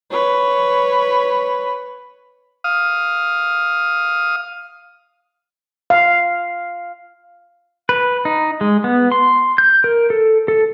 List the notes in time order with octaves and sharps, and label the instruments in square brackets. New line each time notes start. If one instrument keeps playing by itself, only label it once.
[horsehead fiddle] B4 C#5
[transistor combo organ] F5 D#6
[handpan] F5
[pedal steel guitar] B4
D#4
G#3
B3
C6
G6
A#4
A4
A4